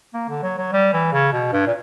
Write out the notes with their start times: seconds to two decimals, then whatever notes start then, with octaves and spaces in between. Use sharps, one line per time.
0.14 A#3
0.29 D3
0.43 F#3
0.58 F#3
0.73 G3
0.93 E3
1.12 C#3
1.33 B2
1.52 G2
1.67 A#2